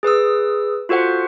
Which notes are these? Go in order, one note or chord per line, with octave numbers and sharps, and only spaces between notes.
G#4 B4 D#6 E6
F4 F#4 A4 C5 F#5